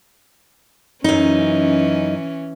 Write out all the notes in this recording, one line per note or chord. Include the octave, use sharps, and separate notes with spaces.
F#2 E3 C#4 D#4